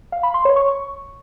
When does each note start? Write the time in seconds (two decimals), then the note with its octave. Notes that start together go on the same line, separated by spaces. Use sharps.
0.12 F5
0.23 B5
0.34 C6
0.45 C#5
0.56 C#6